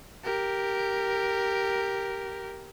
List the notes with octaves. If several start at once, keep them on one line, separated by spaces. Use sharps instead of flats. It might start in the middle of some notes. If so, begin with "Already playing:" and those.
G4 A#4